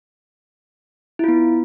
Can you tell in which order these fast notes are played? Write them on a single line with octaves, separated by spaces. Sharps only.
E4 F4 B3